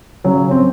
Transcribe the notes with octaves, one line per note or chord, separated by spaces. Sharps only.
C#3 F#3
C4